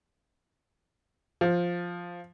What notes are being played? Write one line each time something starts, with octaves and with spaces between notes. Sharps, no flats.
F3